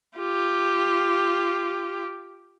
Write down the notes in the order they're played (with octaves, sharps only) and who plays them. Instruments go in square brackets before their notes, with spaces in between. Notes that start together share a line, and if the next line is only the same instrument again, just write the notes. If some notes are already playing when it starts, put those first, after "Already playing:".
[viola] F4 G4